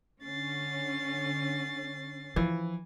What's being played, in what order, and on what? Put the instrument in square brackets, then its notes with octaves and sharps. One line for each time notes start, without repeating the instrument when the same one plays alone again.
[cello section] D3 C#4 [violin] A6 C7
[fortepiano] E3 [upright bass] F3